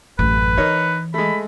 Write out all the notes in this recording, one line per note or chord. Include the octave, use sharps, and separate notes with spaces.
A1 F#2 B4
E3 D#4 A#4 C#5
G#3 A3 B5